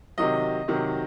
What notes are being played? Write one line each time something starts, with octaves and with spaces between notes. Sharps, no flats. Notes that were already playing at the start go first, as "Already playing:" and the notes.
C3 D#3 F#3 D#5
C3 D#3 F#3